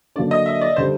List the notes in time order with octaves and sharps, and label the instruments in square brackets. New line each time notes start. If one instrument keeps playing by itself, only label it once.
[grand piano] D3 F#3 A#3 D4 [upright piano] D5
[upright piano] D#5
E5
D5
[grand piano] D3 G3 [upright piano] C5